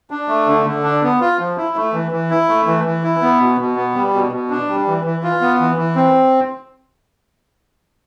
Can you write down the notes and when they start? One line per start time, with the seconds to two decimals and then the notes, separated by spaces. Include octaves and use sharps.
0.11 D4
0.29 A3
0.47 D3
0.66 D3
0.83 D4
1.03 B3
1.21 F4
1.39 F3
1.58 E4
1.76 A3
1.93 E3
2.11 E3
2.31 E4
2.49 A3
2.66 E3
2.85 E3
3.03 E4
3.22 B3
3.40 B2
3.59 B2
3.76 B3
3.94 G3
4.13 B2
4.32 B2
4.50 D4
4.68 G3
4.87 E3
5.05 E3
5.23 F4
5.41 B3
5.60 E3
5.77 E3
5.96 C4